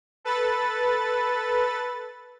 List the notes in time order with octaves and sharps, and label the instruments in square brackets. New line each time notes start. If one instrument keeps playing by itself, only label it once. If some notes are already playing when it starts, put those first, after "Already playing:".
[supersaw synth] A4 B4 A6